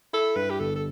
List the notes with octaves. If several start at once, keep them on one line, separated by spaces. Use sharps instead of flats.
E4 A4
G2 B4
G4
G1 A4
A4